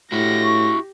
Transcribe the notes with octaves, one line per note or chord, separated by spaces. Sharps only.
A2 E4 F#4 G4 A#6
C#6